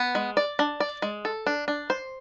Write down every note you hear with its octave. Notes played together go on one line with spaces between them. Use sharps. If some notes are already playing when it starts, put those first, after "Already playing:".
Already playing: B3
G#3
D5
D4
D5
G#3
A4
D4
D4
C5